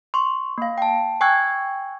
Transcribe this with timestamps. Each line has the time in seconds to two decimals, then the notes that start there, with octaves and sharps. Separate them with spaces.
0.14 C6 C#6
0.58 A#3 F5
0.78 G5 A5
1.21 G5 G#5 C#6 E6 F#6 G#6